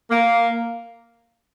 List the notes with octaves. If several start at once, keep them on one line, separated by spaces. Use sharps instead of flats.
A#3